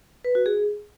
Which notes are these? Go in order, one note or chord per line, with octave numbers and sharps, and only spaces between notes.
B4
F#4
G#4